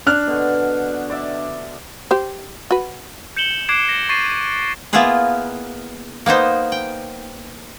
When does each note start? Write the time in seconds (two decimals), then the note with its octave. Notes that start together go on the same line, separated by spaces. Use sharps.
0.06 D4 F6 F#6
0.27 B2 D3
1.10 D5 E5
2.11 G4 C5
2.71 F#4 B4
3.37 G6 C#7 E7 F#7 G7
3.69 D6 F#6 G#6 C7 D7 E7
3.89 A#6
4.09 C#6 A6 C7 D#7
4.93 A#3 B3 E4 F4 G#4 B4
6.26 A#3 B3 D#4 C5
6.72 G5